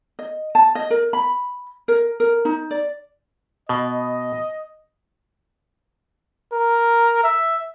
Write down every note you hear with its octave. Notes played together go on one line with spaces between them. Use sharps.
D#5
A5
D#5
A#4
B5
A#4
A#4
D#4
D5
B2 D#5
A#4
E5